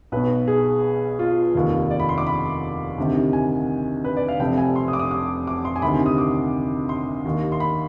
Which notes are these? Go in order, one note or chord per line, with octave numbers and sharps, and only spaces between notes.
B1 B2 B4
G#4
F4
F1 D#2 D#3
D5
B5
C6
D6
B5
D2 C3 D#3
G#5
B4
D5
F5
F1 F2 C3 G5
G#5
C6
D#6
D6
D#6
D6
D6
C6
G#5
D2 C3 D#3 B5
C6
D#6
D6
C6
D#2 D#3
C6
B5